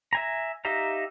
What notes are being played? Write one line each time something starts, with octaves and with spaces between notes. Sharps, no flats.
E5 G#5 A#5
D#4 G4 E5 F5 A#5